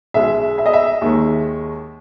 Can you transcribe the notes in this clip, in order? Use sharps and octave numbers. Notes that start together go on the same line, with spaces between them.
B1 B2 G#3 E5
E5
D#5
E5
D#2 D#3 G#3